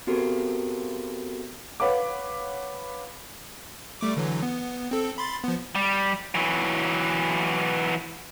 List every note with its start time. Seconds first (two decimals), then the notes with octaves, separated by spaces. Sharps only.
0.07 B3 C4 F#4 G4 A4 A#4
1.80 B4 C#5 F5 F#5 D6
4.01 G3 A3 D6
4.17 D3 E3 F#3
4.42 B3
4.91 C4 A4
5.18 B5 C6 A6
5.44 F3 B3
5.75 G3
6.35 E3 F#3